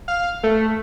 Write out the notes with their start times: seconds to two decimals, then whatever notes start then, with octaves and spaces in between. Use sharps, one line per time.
0.08 F5
0.43 A3